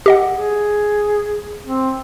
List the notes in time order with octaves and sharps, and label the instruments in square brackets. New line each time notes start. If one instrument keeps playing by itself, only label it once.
[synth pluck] G4 D#5 F#5
[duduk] G#4
C4